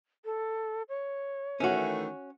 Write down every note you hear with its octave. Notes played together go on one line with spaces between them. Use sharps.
A4
C#5
D#3 E3 A3 C#4 F#4